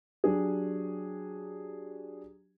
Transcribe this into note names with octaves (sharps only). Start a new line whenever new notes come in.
F#3 D4 G4 G#4